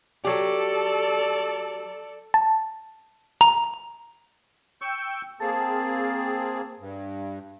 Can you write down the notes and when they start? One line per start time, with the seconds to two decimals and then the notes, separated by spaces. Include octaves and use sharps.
0.24 F#3 G4 A4 D5
2.34 A5
3.41 A#5
4.82 G5 C#6 E6 G6
5.41 A#3 C4 G#4 A5
6.80 G2